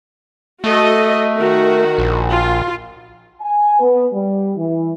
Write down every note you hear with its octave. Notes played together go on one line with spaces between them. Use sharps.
A3 F#4 A4 D#5
D#3 F#4
A#1
F4
G#5
B3
G3
E3